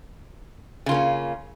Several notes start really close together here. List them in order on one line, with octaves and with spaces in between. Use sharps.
C#3 F4 A#3 C#4